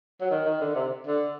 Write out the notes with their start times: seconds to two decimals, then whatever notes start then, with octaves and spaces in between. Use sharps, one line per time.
0.21 F#3
0.30 D#3
0.46 D#3
0.61 D3
0.75 C3
1.07 D3